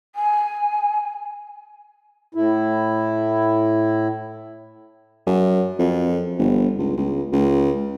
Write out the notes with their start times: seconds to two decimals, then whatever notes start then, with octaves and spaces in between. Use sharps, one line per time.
0.15 G#5
2.35 A2 E4
5.27 F#2
5.79 F2
6.39 G1
6.79 C#2
6.97 C#2
7.33 C#2